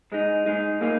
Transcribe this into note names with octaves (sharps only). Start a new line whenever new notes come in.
G#2 G#3 D#4
G#2 G#3 D#4
A#2 A#3 D#4